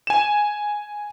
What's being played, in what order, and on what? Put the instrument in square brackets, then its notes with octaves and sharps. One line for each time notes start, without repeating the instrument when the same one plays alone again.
[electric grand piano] G#5 E7